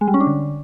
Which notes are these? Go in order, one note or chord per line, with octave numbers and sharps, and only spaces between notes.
G#3
G3
C#4
D4
D3